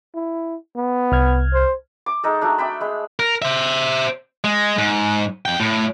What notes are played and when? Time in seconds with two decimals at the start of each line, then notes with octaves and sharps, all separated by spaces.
0.14 E4
0.76 B3
1.12 C2 F6 G#6
1.54 C5
2.06 D6
2.23 G#3 D#4 A4
2.41 F#3 A3 D4
2.58 D5 E5 G5 B5
2.81 G#3 B5
3.20 A#4
3.42 C5 E5
4.44 G#3
4.78 G#2
5.45 F2 G5
5.60 A2